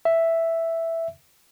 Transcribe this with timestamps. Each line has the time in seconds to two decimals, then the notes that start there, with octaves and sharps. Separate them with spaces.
0.05 E5